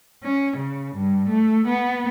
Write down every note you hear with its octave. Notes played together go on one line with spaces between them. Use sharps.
C#4
C#3
G2
A3
B3